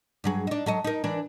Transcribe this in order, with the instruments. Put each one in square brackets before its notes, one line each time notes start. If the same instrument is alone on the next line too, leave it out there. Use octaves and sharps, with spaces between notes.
[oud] G2 F#3 G#4
D4 D#4
F#3 A4 D#5
D#4 A#4
E3 D4 A#4